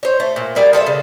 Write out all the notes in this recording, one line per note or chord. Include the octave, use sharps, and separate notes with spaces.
C5 C#5
A3
A#2
G3 G#4 A#4 D5
F4 A4 C5 E5
C#3